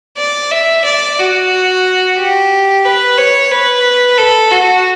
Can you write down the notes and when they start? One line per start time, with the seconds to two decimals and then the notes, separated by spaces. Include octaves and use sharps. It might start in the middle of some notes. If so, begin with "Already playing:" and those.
0.18 D5
0.51 E5
0.85 D5
1.18 F#4
2.18 G4
2.85 B4
3.18 C#5
3.51 B4
4.18 A4
4.51 F#4